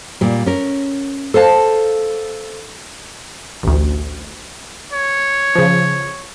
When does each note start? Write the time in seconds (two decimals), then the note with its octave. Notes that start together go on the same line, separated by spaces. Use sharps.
0.21 A#2 G3
0.46 C#4 A#4
1.34 A4 C5 F5 A5
3.63 A1 D2
4.93 C#5
5.55 C#3 F3